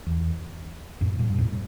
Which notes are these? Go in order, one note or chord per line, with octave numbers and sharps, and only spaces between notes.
E2
F2 A2
G2 A#2
G2
F2 A2